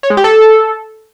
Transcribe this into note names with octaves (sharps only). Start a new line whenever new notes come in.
C#5
G#3
G4
A4